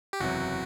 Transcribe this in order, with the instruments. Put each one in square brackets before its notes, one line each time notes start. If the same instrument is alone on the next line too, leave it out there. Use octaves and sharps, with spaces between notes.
[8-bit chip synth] G4
[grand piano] F#1 E2 C3 F#3 [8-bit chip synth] F#4